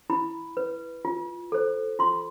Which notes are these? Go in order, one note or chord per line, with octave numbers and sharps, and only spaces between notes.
E4 B5
B4
F4
A4 C5
F4 C6